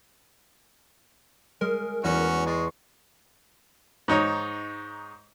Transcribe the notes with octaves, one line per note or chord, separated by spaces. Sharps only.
G#3 A#4
E2 C#4 F#4
G#3 C6 C#6 A6
G#2 D#4 C#5 D#6